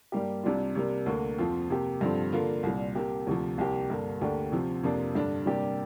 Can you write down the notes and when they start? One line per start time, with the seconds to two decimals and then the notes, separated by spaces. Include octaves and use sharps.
0.12 G2 G3 A#3 G4
0.43 C2 C3 G3 D4 F4
0.75 C3 G3 A#3
1.06 D2 D3 A#3 D4
1.38 F2 F3 C4 F4
1.70 C3 A#3 G4
2.01 G2 D3 F3 C4
2.32 D3 A#3 F4
2.63 C2 A#2 G3
2.95 C3 A#3 G4
3.27 D2 C3 F3
3.58 C2 C3 A#3 G4
3.90 G2 D3 A#3
4.21 D2 D3 A#3 D4 G4
4.52 C3 F3 C4
4.83 F2 C3 F3 A#3 D4
5.15 G2 D3 G3 D4
5.46 C3 G3 A#3 D4 G4